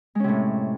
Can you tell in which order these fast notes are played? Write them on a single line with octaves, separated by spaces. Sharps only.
G#3 C#4 C3 A2